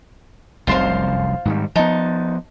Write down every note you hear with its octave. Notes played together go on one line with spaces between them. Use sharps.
F1 C2 F#2 F4 C5 F5
G#2 D#3 G3
F3 B3 D#4 A5